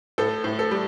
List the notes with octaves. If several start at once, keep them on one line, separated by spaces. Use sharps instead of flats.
A2 A4
A2
A4
G3